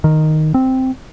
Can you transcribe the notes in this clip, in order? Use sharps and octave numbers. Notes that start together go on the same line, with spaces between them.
D#3
C4